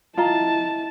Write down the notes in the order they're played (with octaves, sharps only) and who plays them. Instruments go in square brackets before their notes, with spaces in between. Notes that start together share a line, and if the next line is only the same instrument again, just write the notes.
[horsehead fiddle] E4 A5 [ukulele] F4 D#5 A#5